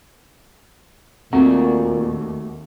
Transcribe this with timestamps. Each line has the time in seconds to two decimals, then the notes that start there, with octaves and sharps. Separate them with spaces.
1.33 D#2 A#2 A3 C4 F#4